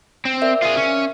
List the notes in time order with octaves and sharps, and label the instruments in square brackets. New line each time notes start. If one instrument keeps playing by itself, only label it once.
[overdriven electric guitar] C4
[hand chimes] A#4 D5 E5
[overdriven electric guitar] F4 G#4
C#4